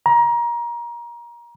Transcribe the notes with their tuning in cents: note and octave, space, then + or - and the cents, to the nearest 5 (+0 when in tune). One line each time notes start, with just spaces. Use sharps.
A#5 +25